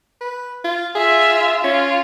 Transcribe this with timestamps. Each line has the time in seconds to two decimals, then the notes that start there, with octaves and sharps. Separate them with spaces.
0.21 B4
0.64 F4
0.95 F4 G#4 E5
1.64 C#4 F4